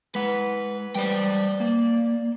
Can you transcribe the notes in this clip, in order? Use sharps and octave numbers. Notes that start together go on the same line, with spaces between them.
G#3 B4 F#5
G3 B4 C5 D5 G5
A#3